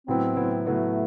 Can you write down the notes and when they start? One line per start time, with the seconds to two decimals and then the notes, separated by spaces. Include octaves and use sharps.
0.07 A2 F#3 B3 C4 E4
0.36 A2 F#3 B3 E4
0.65 A2 F#3 A3 B3 E4